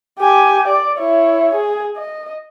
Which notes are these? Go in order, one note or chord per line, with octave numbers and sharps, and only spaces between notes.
G4 G#5
D5
E4 C#5
G#4
D#5